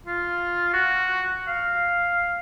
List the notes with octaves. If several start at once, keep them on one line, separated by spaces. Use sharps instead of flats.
F4
F#4
F5